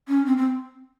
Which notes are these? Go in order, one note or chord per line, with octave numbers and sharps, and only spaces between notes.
C#4
C4
C4